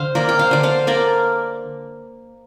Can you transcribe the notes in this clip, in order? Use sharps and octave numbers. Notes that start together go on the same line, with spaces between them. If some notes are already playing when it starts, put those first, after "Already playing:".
Already playing: D3 C5 F5
A#3 A#4 D5
G5
C5 F5
D3 D5
C5 F5
A#3 A#4 D5